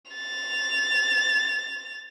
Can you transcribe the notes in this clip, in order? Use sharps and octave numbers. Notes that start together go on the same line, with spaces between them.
A6 F7